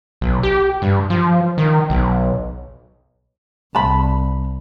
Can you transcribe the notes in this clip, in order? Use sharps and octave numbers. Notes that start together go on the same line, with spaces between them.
B1
G4
G2
F3
D#3
B1
C2 A5 B5